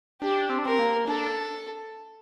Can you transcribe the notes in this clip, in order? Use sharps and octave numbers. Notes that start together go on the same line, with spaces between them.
D4 G4
C4
D4
C4 A#4
A#3
D4 A4